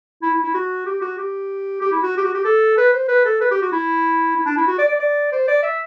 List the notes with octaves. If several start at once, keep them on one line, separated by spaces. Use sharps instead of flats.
E4
E4
E4
F#4
G4
F#4
G4
G4
E4
F#4
G4
F#4
G4
A4
B4
C5
B4
A4
B4
G4
F#4
E4
E4
D4
E4
F#4
D5
D5
D5
C5
D5
E5